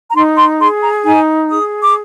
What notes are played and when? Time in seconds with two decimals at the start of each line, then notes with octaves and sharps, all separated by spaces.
0.10 A#5
0.15 D#4 C6
0.38 C6
0.60 G#4 C6
0.82 A#5
1.05 D#4 G#5
1.50 G#4 D#6
1.84 D6